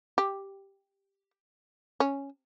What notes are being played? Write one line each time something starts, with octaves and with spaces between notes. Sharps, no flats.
G4
C#4